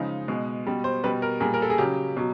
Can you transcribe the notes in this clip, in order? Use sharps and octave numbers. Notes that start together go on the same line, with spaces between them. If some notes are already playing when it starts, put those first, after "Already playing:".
Already playing: C#3 F3 G#3 D#4
B2 G#3
B2 G3
C5
B2 G3 B4
A#4
A#2 G3 G#4
A#4
A4
G#4
C#3 F#3 G4
B2 F#3